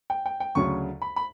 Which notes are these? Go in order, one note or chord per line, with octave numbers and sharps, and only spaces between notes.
G5
G5
G5
D2 C#3 F#3 C#6
B5
B5